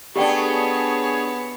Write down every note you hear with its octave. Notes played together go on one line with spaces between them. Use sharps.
A3 B3 D4 G4 G#4 C#5 D5 G5